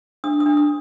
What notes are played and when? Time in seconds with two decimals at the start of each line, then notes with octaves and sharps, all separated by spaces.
0.24 D4 D#6
0.40 D#6
0.46 D4
0.57 D#6